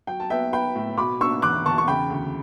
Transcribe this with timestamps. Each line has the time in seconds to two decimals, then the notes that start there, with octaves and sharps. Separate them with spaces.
0.07 F#3 G5
0.20 A5
0.30 B3 E5 G5
0.52 B3 G5 B5
0.75 A2
0.97 B2 B5 D6
1.20 D4 C#6 E6
1.42 E2 D6 F#6
1.66 E2 A5 C#6
1.78 C#6
1.88 C#3 G5 B5
2.10 D2